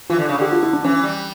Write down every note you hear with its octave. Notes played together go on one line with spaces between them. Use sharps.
E3 F4
D3
C#3
D3 G4
F4
E4
D4
E3 C#4
G3